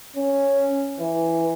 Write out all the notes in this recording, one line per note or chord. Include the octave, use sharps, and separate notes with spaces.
C#4
E3